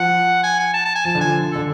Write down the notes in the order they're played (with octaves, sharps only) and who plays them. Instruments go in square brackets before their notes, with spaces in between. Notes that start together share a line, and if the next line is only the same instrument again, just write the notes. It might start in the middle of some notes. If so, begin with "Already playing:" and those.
Already playing: [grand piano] F3 [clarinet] F#5
[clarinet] G#5
G#5
A5
A5
G#5
[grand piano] F3 [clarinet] A5
[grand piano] D3
[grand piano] F3 [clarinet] G#5
[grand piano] D3 [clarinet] A4